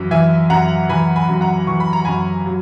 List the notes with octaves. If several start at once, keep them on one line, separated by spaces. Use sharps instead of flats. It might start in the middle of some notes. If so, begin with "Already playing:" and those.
Already playing: F#2 E3
E3 E5 G#5
F#2 F#5 A#5
E3 G#5 B5
G#5 B5
F#2
F#5 A#5
E3 C#6
B5
A#5
F#2 G#5 B5
F#3